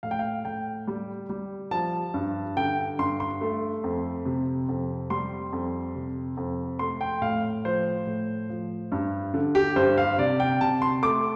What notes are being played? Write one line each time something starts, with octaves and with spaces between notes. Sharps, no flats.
A2 F5
G5
F5
A2 G5
G3
G3
F3 A5
G2
D3 G5
G2 C6
C6
A3
F2
C3
F2
G3 C6
F2
C3
F2
A3 C6
G5
A2 F5
F3 C5
A2
F3
G2
D3
G4
G2 C5
F5
C3 D5
G5
C3 A5
C6
A3 D6